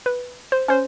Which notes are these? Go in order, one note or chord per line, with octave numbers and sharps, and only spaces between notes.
B4
C5
C#4 C5